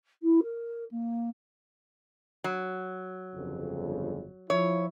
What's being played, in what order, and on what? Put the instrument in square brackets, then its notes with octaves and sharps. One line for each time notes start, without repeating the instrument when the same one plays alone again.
[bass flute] E4
A#4
A#3
[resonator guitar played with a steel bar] F#3
[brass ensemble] G1 F2 C#3
[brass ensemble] F3 E4 [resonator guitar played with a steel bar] C#5